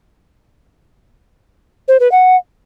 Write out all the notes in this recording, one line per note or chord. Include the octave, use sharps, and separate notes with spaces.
C5
B4
F#5